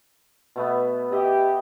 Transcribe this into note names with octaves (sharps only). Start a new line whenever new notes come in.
B2 A3 B3
G4 G#4 D#5 E5